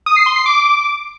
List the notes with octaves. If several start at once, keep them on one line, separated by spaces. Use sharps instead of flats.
D#6
C7
C6
C7
D6